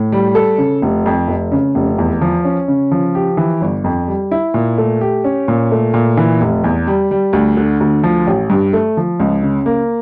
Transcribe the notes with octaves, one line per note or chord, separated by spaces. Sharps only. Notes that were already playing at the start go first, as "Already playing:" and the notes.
Already playing: A2
G3
A4
C#3
F1
F2
F1
C#3
F1
E2
F3
C#4
C#3
F3
G4
E3
G1
F2
G3
E4
A#2
A3
G4
C#4
A#2
A3
A#2
E3
F1
E2
G3
G3
D2
D3
D2
F3
A1
G2
A3
F3
C#2
C#3
A#3